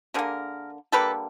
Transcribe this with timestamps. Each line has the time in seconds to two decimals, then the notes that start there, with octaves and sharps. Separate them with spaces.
0.14 D3 G3 G#4 A#4
0.19 A#3
0.92 D3 G3 A#3 A4 B4